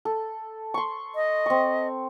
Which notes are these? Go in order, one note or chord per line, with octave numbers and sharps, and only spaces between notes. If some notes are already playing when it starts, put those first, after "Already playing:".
A4
C6 C#6
D#5
C4 C#6